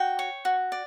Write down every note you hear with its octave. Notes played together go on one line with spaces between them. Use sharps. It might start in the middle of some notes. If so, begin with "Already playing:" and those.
Already playing: F#4 G5
C#5
F#4
D5